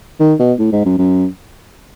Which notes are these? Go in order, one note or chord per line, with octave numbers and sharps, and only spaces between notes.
D#3
B2
A2
G#2
F#2
F#2